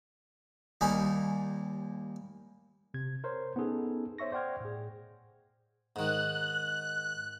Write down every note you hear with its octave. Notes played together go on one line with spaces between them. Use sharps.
D#2 D#3 G3 G#5 B5
C3 G#6
A#4 C5 C#5
B3 C#4 D#4 G#4 A4
C5 C#5 E5 C#6 A#6
C5 D5 F#5 G5 F6 G#6
A2 G#4
G#2 D#3 F#6